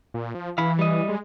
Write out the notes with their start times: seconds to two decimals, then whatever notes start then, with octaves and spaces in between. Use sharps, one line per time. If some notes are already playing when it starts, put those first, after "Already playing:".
0.14 A#2
0.35 F3
0.58 E3 F5 B5
0.79 G3 D#5
1.09 G#3